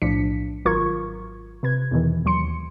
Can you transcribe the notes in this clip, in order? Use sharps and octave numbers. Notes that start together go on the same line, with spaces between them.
B1 A2 F3 D4 B6 C#7
G#1 F#3 F4 A#4 C#6 G#6
C3 B4 G#6
E2 B2 D#3 E3
D#2 F#3 C6 C#7